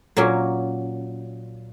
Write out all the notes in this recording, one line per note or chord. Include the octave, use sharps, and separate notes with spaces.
A#2 F#3 A#3 C#4